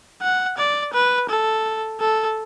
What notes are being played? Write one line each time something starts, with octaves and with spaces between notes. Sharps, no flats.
F#5
D5
B4
A4
A4